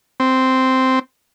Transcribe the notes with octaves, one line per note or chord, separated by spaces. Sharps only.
C4